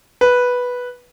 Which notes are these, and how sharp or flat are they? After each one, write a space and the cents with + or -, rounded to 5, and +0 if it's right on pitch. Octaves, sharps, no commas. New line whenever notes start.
B4 -5